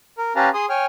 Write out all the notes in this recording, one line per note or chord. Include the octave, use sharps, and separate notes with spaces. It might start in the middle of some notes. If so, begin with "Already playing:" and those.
A#4
C#4 G4 B4 F5 A5 A#5
G#4 C6 D#6
C#5 G5 G#5 F6